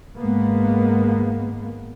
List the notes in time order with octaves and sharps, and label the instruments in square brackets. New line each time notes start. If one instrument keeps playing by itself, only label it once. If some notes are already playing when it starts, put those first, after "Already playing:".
[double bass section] G#1 G#2 G#3 A#3 B3